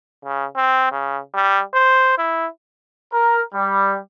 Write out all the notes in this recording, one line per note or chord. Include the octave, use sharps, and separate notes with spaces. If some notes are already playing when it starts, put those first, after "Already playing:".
C#3
C4
C#3
G3
C5
E4
A#4
G3